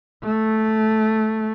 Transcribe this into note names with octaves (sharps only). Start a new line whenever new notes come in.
A3